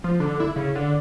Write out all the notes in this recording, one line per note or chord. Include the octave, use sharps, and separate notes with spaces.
F3
D3
E4
C#3
D3